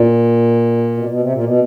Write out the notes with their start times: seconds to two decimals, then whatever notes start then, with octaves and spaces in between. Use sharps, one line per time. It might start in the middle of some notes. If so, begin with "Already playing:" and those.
Already playing: A#2
0.97 B2
1.09 B2
1.21 C3
1.33 A#2
1.44 B2